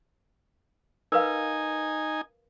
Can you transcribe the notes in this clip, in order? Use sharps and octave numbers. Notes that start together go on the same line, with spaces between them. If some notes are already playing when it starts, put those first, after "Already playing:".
D#4 A#4 B4 F5 G#5